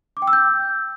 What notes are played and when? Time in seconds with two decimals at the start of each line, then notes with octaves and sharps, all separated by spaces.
0.17 D6
0.22 G5
0.27 E6
0.33 G6